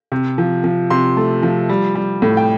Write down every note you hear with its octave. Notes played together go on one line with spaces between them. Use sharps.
C3
F3
F3
C3 C6
A3
F3
G3
G3
A2
G5